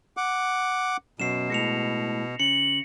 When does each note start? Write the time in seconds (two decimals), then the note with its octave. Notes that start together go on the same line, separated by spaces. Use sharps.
0.17 F#5 D6
1.20 F#2 B2 F#3 C7 E7
1.50 A2 G#3 A#6 C#7 F7
2.40 C#3 C#7 F#7